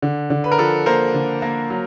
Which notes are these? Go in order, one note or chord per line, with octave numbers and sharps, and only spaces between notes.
D3
D3
B4
A#4
F3 A4 B4
A#3 A#4 C5
D3
A#3
F#3